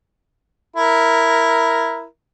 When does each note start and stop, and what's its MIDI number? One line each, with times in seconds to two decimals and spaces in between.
0.76 2.05 64
0.76 2.05 70